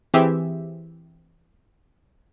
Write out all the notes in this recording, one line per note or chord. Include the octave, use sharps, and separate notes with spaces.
E3 C4 G4 G#4 E5